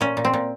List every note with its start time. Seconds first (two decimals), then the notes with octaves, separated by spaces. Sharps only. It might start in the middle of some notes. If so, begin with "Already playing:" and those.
0.01 A#2 C#4
0.17 A#2
0.25 C4
0.33 A#2